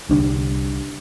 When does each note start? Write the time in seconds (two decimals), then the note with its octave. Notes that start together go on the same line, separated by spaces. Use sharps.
0.09 C2 D3 G3 D4